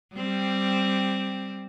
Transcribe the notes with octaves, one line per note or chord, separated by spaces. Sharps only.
G3 C4